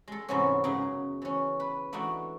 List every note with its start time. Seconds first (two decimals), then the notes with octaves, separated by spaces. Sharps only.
0.08 G#3 A4
0.29 G#2 C3 E3 G#3 B3 C#4
0.64 F#2 C#3 D#4 G#4
1.22 E3 C#4
1.60 B4
1.93 E3 A3 D4 D#4 F#4